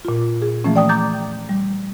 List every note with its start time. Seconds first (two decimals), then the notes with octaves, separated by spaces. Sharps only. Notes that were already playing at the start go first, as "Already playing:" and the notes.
0.05 A#2 F4
0.42 G#4
0.64 E3 F3 A3 A#3 C#4
0.76 D5 G5 D#6
0.89 A#5 D6 G6 A6
1.49 G3